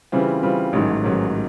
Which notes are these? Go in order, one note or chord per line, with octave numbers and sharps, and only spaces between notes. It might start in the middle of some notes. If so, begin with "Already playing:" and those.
C#3 E3 G3 C4 F4
C#3 E3 G3 C4 F4
A1 G#2 D#3 F#3
A1 G#2 D#3 F#3